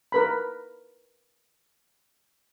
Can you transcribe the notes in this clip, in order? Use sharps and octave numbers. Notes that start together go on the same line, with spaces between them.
A#4 B4 B5